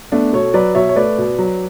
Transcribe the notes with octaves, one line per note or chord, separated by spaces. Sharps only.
A3 B3 D4
B2 A4 C#5
F#3 B4 D5
B2 C#5 E5
C#5
A3 B4 D5
B2
F#3